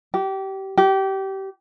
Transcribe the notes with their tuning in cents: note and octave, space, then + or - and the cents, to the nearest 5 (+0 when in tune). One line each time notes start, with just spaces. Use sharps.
G4 -25
G4 -25